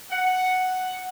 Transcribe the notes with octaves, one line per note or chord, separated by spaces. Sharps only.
F#5